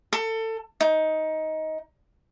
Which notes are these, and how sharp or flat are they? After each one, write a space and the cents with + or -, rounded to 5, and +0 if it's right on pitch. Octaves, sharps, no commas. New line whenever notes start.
A4 +25
D#4 +15